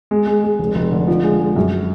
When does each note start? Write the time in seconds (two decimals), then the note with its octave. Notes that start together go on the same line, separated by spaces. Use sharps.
0.11 G#3
0.27 G#3
0.44 G#3
0.59 F1
0.75 F1
0.92 D3
1.07 F3
1.24 G#3
1.40 G#3
1.56 F#2